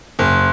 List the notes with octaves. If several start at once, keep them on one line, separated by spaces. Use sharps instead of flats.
F#1